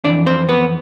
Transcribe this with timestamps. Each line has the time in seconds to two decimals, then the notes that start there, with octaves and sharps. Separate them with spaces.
0.04 F2 E3 D4 D5
0.26 C4 C5
0.49 B3 B4